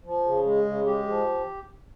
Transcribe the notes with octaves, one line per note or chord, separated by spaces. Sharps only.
F3
C#3
G#3
C#3
G#3 G4
F3